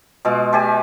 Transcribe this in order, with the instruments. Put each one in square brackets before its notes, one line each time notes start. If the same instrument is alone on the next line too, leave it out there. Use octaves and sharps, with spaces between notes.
[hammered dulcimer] B2 G#3 F4
G#3 G4 D5 G#5